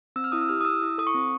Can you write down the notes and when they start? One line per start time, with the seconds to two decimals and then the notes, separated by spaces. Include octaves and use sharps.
0.16 C4 E6
0.24 F6
0.32 E4 D#6
0.41 E6
0.49 G4 F6
0.61 D#6
0.65 E4 E6
0.82 E4
0.98 A4 D#6
1.07 C#6
1.14 C4